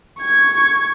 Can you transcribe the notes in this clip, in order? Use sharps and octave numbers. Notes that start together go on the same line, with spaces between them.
C#6 G#6